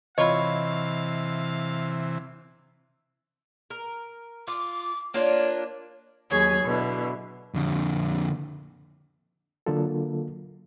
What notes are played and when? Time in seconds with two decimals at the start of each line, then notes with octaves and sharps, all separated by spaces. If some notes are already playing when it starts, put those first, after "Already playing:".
0.18 C3 E3 F4 C#5 D#5 F5 B5
3.70 A#4
4.47 F4 D6
5.14 A#3 D4 F4 C#5
6.30 D#2 F#3 G#4 C#5 G#6
6.65 B2 D3 E4
7.54 F2 D3
9.66 D3 F#3 A#3 F4 A4